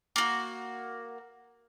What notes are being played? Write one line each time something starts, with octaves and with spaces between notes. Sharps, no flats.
A#3 F#4